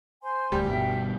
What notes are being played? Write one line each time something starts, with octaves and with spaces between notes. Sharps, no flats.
C5 G#5 C6
D1 D2 G3
G1 G2 B2 E5 G5